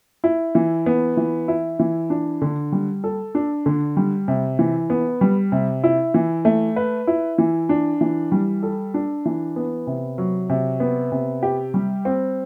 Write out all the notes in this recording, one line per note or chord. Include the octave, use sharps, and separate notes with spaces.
E4
E3
B3
E3
E4
E3
D4
D3
G3
A4
D4
D3
G3
C3
E3
B3
G3
C3
E4
E3
A3
B4
E4
E3
D4
E3
G3
A4
D4
E3
B3
C3
F#3
C3
B3
C3
G4
G3
C4